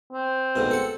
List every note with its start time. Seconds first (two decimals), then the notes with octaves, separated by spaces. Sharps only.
0.12 C4
0.56 D2 G#2 B2
0.71 A4 F#5